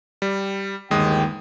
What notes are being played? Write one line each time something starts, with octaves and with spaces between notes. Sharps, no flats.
G3
G1 D#2 G#3 G5 D#6